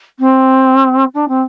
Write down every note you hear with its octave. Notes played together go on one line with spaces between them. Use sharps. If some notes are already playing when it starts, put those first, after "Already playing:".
C4
D4
C4